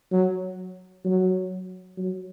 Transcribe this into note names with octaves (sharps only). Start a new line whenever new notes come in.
F#3
F#3
F#3